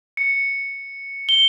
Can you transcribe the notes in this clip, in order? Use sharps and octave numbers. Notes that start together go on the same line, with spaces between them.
C#7
G7